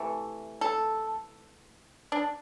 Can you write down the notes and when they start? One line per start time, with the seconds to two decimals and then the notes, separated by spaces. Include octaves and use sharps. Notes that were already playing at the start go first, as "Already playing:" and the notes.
Already playing: C3 E3 A3
0.61 A4
2.12 D4